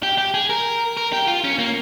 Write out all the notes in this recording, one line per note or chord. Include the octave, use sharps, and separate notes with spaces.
G4
G4
G#4
A#4
A#4
G4
F4
C#4
A#3